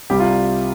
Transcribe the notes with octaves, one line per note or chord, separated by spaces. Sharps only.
C2 C3 G3 G4
F4